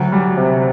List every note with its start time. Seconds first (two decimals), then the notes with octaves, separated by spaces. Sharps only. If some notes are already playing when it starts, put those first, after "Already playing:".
Already playing: D2 F#3
0.12 G3
0.37 C3